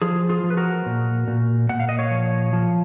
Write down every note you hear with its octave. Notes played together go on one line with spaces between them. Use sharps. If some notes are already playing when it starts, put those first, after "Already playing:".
F3 F4 G#4
F4 G#4
F3
B4
F#4 A#4
A#2
A#2
A#2 F#5
F5
D#5
C#5 F5
F3
F3